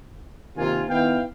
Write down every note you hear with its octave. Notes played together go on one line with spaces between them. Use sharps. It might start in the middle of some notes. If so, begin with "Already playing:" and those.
C3 D#3 A#3 F4 G#5
D#3 B3 E4 F5 G5